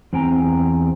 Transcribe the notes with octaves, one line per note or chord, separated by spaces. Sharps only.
E2 C4 G5 G#5 A#5